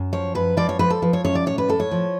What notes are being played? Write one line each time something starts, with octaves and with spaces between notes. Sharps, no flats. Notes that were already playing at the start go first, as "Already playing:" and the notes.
Already playing: F#2
F3 C#5
F#2 B4
F3 D5
C#5
F3 B4
A4
F3 B4
C#5
F#2 C#5
D5
A2 C#5
B4
A2 A4
C#5
F3